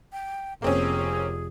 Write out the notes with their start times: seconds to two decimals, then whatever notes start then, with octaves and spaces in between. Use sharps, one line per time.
0.12 G5
0.62 F1 A#3 C4 C#4 G#4